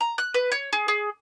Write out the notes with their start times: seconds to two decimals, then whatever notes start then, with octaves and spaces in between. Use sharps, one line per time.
0.01 A#5
0.18 F#6
0.34 B4
0.52 C#5
0.73 G#4
0.88 G#4